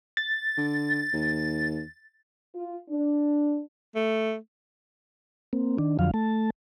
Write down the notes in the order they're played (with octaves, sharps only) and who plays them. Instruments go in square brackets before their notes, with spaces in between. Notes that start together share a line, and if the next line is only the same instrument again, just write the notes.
[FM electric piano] A6
[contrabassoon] D3
D#2
[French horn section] F4
D4
[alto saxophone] A3
[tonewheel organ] A#3 C4
D#3 D4
F2 D3 F3 F#3 F5
A3 A5